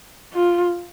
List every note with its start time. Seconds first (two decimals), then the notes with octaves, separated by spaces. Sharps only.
0.33 F4